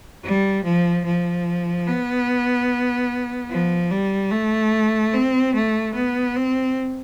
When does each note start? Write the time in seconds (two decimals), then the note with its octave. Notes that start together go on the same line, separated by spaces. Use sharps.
0.24 G3
0.64 F3
1.05 F3
1.87 B3
3.50 F3
3.90 G3
4.31 A3
5.13 C4
5.54 A3
5.94 B3
6.36 C4